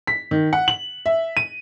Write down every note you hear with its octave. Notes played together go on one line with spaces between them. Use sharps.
B6
D#3
F#5
F#7
E5
D#7